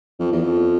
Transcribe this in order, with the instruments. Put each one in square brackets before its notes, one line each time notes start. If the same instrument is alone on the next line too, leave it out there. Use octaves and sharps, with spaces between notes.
[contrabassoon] F2
E2
F2